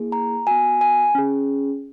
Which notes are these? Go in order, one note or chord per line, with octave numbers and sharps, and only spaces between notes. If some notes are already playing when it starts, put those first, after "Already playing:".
Already playing: A#3 E4 G#4
A#5
B3 F#4 G#5
G#5
C#4 G#4